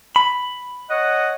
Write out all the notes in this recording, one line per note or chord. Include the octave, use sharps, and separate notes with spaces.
B5
C#5 D#5 F#5